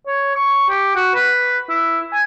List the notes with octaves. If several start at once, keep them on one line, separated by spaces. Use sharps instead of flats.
C#5
C#6
G4
F#4
B4
E4
G#5